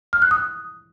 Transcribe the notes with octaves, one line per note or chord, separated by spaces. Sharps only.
F6
F#6
D#6